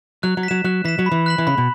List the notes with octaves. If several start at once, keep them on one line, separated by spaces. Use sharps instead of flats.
F#3 F#6
F#3
B6
F#3 E7
F#3 F#6
E3 B6 E7
F#3
B5
E3
F#6 B6 F#7
E3
C#3 B5
B2